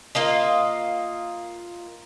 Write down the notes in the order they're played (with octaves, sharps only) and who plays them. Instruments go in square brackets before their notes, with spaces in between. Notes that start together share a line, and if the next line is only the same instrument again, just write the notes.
[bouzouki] A#3 F4 D#5